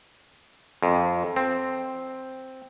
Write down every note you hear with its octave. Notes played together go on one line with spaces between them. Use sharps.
F2
C4